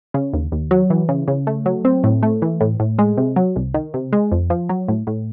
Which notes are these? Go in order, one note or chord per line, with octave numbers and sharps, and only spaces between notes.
C#3
D#2
D#2
F#3
E3
C#3
C#3
A3
F#3
C4
A2
A3
E3
A2
A2
G#3
C3
F#3
C2
D#3
C3
G#3
F2
F3
F#3
A2
A2